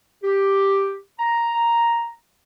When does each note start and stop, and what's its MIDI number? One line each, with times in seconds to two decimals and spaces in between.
0.24 0.96 67
1.20 2.10 82